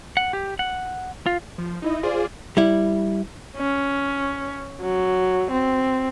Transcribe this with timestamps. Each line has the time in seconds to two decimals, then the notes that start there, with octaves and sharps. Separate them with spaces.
0.17 F#5
0.33 G4
0.59 F#5
1.26 F4
1.58 F3
1.82 D#4 E4 D#5
2.03 F4 G#4 C5 D5
2.57 G3 E4
3.57 C#4
4.82 F#3
5.51 C4